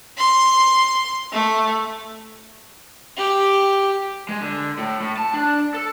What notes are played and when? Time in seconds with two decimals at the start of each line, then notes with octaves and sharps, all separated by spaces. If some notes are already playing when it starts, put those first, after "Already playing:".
0.17 C6
1.32 A3
3.17 G4
4.29 G#3
4.40 D3
4.78 A2
5.00 A2
5.17 A5
5.34 D4
5.75 A4